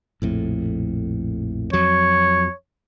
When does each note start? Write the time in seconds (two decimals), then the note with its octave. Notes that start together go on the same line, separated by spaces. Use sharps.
0.22 A#1 F2 A2
1.73 F2 F#3 C#5